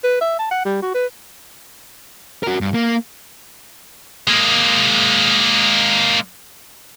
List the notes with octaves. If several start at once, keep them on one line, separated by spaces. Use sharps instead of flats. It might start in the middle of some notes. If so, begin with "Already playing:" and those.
B4
E5
A5
F#5
G3
F#4
B4
F#4 A#4
G2
A#3
G#3 A#3